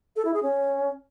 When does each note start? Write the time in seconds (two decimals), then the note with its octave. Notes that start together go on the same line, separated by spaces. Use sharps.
0.16 A4
0.25 E4
0.34 G#4
0.43 C#4